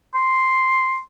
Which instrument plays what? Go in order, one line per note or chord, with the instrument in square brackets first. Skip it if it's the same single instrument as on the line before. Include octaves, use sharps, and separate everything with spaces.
[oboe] C6